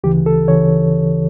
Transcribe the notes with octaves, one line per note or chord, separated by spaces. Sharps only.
D2 C#3 E3 G4
A4
C#3 E3 C#5